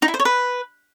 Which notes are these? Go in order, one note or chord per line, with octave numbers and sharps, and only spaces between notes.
D#4
E4
C5
C#5
B4